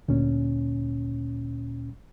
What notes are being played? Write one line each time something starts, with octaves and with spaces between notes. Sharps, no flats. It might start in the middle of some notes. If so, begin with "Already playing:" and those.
D2 A#2 C#4